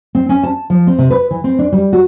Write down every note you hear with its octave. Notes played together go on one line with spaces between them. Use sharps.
C4
C#4
A5
F3
C4
C3
B4
E3
C4
D4
G3
F#4